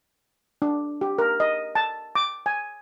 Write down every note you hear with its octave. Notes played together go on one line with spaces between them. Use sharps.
D4
G4
A#4
D#5
A5
D6
G#5